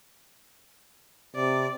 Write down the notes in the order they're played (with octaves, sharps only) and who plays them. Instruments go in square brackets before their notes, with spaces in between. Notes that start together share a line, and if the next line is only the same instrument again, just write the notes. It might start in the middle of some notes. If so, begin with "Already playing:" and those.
[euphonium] C3 [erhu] D5